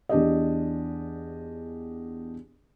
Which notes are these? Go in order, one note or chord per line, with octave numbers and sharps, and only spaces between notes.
E2 D4 G4 D#5